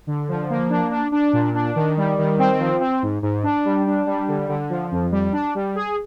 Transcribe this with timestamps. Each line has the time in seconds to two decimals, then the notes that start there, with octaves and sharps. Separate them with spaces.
0.07 D3
0.29 F3
0.50 A#3
0.70 D4
0.91 D4
1.12 D4
1.33 A#2
1.55 D4
1.76 D#3
1.97 G3
2.18 D#3
2.39 C4
2.59 F3
2.80 C4
3.02 G#2
3.22 G#2
3.44 D4
3.65 G3
3.87 D4
4.07 G3
4.28 D3
4.49 D3
4.70 F3
4.91 F2
5.12 G3
5.33 D4
5.55 G3
5.75 G#4